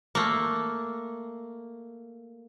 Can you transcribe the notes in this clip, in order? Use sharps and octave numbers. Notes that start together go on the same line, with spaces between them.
A3 A#3